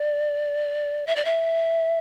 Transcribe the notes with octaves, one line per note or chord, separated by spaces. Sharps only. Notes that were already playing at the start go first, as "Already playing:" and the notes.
Already playing: D5
E5
D5
E5